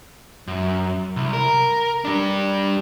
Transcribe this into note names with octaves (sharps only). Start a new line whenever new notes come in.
F#2
C2
A#4
G3 D4